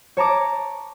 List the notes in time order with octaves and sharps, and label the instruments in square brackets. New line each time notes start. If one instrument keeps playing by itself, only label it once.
[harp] C#5 A5 A#5 D6